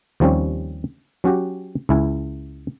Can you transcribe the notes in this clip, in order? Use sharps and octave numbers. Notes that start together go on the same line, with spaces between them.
D#2 F3 G3 C4 C#4
F#3 C#4 F#4 G4
C#2 E4 G#5